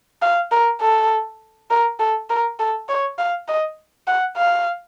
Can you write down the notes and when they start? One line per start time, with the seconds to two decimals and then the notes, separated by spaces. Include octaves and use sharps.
0.22 F5
0.51 A#4
0.81 A4
1.70 A#4
1.99 A4
2.30 A#4
2.59 A4
2.88 C#5
3.18 F5
3.48 D#5
4.07 F#5
4.37 F5